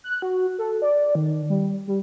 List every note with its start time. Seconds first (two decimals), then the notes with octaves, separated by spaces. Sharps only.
0.04 F#6
0.22 F#4
0.59 A4
0.82 D5
1.15 D#3
1.50 G3
1.87 G3